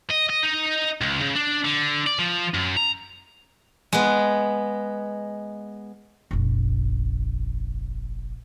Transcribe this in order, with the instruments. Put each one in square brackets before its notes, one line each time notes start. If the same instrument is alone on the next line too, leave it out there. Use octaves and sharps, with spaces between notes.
[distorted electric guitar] D#5
D#5
D#4
C#2
C#3
D4
D3
D5
F3
F#2
A#5
[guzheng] G#3 B3
[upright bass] F1 A#1